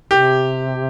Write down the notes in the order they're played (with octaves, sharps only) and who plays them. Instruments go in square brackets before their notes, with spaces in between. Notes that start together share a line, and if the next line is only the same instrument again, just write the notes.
[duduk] C3 [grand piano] G4